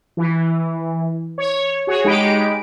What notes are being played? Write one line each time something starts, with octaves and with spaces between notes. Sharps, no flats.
E3
C#5
F#4 G#4 C#5
G#3 D#4 G4 B5 D7